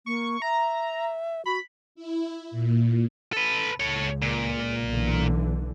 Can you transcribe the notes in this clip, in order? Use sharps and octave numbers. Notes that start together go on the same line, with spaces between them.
A#3 C#6
E5 A#5
F#4 B5
E4
A#2
A4 B4
C#2 A4 C#5
A#2
B1 D3 E3